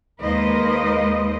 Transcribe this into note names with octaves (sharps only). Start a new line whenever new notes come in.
D#2 G#3 A#3 B4 C5 D#5